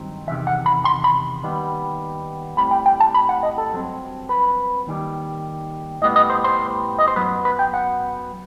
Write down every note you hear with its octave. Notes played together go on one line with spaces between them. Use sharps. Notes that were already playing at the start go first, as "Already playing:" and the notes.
Already playing: G2 D#3 F#3 C4
E2 C3 D#3 E5
F#5
B5
C6
B5
D#2 D#3 G3 B3
A2 G3 C4 B5
G5
G5
A5
B5
F#5
D#5
A4
G2 F#3 C4
B4
D#2 D#3 G3
A2 G3 B3 D#5
D#5
C5
C5
D#5
C5
F#2 F#3 B3 B4
B4
G5
F#5